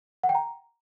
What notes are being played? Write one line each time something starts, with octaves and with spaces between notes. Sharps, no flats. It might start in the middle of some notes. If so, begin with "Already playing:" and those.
F#5
G5
A#5